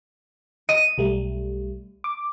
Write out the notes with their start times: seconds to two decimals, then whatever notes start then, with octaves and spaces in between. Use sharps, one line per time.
0.69 D#5 D#7
0.98 B1 G3 A3
2.04 D6